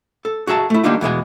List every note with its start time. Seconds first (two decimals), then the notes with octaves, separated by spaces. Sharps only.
0.25 A4
0.47 F#4 G#4 E5 A5
0.70 A3 E4
0.84 D#3 G3 A#3 D4 D#4 F4
1.01 E2 B2 G#3 G#5